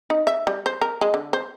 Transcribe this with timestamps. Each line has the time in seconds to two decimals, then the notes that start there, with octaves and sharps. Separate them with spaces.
0.10 D#4
0.27 E5
0.47 G3
0.66 C5
0.81 A#4
1.01 G#3
1.14 D3
1.33 C5